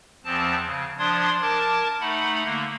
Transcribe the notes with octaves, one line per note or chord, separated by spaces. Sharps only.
E2 F3 C4 A5
C#3
F3 D4 D5 C6 D#6 G#6
A#4 A5 D6 G#6 A6
A3 D#4 F#5 B5
D3 A#3